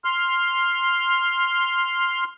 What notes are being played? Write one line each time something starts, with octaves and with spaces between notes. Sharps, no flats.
C6 F6